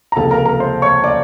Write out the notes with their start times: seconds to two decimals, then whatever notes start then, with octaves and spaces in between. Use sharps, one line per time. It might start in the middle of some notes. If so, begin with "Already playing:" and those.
0.12 A#5
0.16 C#2 C3 F3 A#3 A4 A5
0.31 A#4 A#5
0.46 A#4 A#5
0.60 C5 C6
0.82 C#5 C#6
1.04 D5 D6